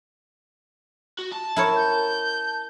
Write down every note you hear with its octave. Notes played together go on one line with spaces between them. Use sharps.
F#4
A5
E4 A#4 C#5
G6